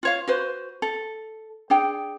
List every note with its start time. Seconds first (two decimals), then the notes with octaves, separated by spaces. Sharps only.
0.03 F4 C#5 F5
0.28 F#4 B4 C5
0.82 A4
1.70 D4 G#4 G5